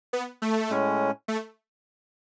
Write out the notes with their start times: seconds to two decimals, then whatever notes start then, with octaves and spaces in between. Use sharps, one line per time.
0.13 B3
0.42 A3
0.70 A2 G#3 C#4
1.28 A3